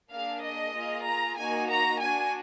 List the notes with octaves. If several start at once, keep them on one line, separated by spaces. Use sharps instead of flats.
A#3 D4 G#4 F5
D#5
A#3 F4 G#4
A#5
A#3 D#4 F#4 G#5
A#5
D4 F#4 G#5